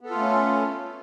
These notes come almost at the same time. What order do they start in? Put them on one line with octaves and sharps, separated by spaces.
B3 A4 F4 A3 C#4